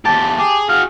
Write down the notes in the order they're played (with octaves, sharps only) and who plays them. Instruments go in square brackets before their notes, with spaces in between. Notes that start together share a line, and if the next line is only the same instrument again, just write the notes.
[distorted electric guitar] E2 G4 [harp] A5
[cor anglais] G4 [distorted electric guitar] G#4
[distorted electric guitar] F#4 G#4 [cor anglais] F5